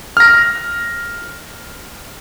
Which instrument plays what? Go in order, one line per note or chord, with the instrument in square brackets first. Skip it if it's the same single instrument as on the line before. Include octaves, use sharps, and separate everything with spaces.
[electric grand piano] F6 A#6